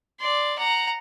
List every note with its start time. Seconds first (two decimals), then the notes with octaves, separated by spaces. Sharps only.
0.20 D5 C6
0.58 F#5 A#5